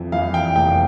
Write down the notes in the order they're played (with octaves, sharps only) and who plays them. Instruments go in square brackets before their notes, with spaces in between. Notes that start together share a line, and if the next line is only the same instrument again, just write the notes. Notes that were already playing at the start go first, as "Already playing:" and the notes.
Already playing: [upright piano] F2 E3
E3 F5
G5
F1 G5